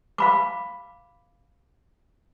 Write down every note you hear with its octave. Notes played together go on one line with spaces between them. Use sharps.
F5 B5 D6